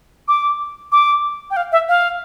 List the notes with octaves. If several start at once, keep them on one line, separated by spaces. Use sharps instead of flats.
D6
D6
G5
F5
E5
F5